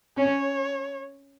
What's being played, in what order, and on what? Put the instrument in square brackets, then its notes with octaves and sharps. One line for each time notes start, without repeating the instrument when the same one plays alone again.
[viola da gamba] C#4 [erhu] C#5